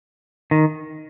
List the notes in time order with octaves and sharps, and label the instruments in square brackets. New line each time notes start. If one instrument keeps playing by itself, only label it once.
[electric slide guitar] D#3